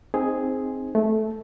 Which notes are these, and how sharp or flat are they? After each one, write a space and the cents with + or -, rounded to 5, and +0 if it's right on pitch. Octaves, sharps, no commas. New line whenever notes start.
C4 +0 D#4 +0 G#4 +0
A3 -15 A4 +0